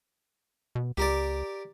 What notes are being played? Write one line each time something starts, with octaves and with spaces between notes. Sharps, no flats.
B2
C#2 G4 A#4 D5